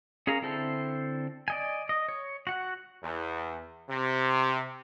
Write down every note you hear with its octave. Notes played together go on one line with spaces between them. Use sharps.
C#4 G#4 A#4 F5 A#5
D3 C4 E4 A4 C5
D5 D#5 G#5
D#5
C#5
F#4 F#5
E2
C3